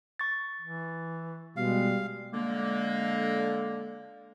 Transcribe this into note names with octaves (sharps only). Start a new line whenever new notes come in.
C#6 A6
E3
B2 G3 G#3 F5
D3 G#3 A#3